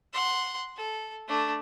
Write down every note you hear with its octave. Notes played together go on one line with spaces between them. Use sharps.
F#5 C6
A4
A3 D4